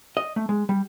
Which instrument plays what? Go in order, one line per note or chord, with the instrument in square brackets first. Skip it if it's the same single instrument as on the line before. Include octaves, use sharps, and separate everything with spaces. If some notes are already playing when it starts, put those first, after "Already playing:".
[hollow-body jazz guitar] D#5
A3
G#3
G3